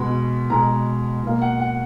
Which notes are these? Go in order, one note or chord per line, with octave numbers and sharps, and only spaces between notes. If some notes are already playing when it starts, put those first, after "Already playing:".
Already playing: B2 G#3 B5
B2 G#3 A#5
B2 A#3
F#5
F#5